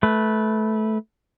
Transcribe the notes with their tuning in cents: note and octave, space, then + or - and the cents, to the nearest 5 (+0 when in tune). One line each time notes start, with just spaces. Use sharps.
A3 -15 B4 -10